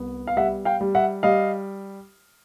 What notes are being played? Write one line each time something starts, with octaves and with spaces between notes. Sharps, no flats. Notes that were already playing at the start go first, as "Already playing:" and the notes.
Already playing: C2 B3
F5
G3 E5 F#5
F5 G5
G3
E5 F#5
G3 D#5 F5